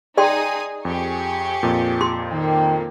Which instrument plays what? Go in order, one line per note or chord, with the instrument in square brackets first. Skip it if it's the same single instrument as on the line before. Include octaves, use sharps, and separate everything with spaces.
[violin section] D#4 G#4 D#6 [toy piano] D5 G5 C6
[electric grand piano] F2 [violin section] G4 G#4 C#6
[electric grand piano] F2 A#2
[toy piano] C6
[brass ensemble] D#3 G5 [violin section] A#3